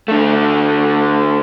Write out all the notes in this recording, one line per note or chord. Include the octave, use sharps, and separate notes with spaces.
D3 A3